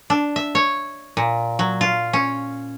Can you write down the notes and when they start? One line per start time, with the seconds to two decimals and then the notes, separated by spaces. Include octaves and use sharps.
0.10 D4
0.36 E5
0.55 C#5
1.17 A#2
1.59 F#3
1.81 F4
2.13 C#4